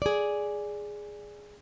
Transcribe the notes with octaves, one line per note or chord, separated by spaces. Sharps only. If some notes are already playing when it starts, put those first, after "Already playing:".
G#4 D5